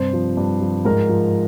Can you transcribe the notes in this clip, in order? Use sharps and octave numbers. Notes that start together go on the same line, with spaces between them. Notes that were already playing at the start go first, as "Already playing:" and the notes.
Already playing: G2 C3 C5
F3
G2
F3
G#2 A#4
F3